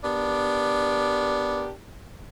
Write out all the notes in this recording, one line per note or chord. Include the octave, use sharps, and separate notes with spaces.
B3 D4 G4 A#4